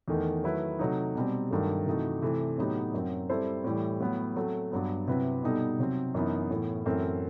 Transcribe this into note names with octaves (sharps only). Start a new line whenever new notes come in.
E2 D#3 A3 D#4
D#3 F#3 A3 E4 B4
C3 F#3 A3 D#4
B2 G3 C4
G2 D#3 F#3 A3
C3 E3 A3 D#4 F#4
C3 E3 A3 C4
A2 F#3 B3 D#4 G4
F#2 F#3 C4
G3 C4 E4 A4 C5
A2 E3 G3
A2 F#3 B3
F#3 A3 C4
G2 F#3 B3
C3 F#3 C4 E4 B4
B2 G3 B3 D#4 A4
C3 F#3 C4
F#2 E3 B3 D#4
A2 E3 B3
F#2 E3 A3 C4